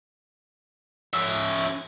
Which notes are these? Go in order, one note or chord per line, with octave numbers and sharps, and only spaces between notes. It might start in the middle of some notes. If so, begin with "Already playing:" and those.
C#4 E5